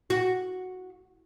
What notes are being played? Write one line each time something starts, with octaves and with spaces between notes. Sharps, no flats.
F#4